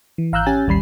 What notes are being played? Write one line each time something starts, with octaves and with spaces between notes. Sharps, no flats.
E3
G#1 F5 A#5 E6 F#6 G6
C#4 G4 G#5 A6
A1 D#2 G3 B5 C7